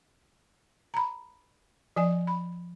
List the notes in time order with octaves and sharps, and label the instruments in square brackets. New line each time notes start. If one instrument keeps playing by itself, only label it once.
[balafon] A#5 B5
F3 D5 G#5
B5